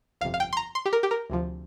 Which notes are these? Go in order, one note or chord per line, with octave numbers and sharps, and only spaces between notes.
G1 F2 C3 F5
F5
G5
C6
A#5
C6
G4
A#4
G4
A#4
D2 C3 F3